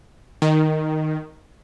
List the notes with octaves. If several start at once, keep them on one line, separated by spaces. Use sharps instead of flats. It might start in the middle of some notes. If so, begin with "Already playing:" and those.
D#3